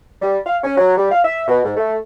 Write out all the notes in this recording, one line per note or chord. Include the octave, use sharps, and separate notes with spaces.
G3
F5
C#4
F#3
G3
F5
E5
B2
G#2
A3